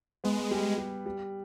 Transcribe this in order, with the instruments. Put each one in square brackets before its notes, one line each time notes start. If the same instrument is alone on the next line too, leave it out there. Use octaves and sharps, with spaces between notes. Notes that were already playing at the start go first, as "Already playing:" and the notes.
[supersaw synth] G#3 [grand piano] B3
[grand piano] G3
G3
G3